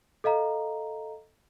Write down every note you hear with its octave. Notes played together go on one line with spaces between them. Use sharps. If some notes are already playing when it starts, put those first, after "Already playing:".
A4 D#5 F5 A#5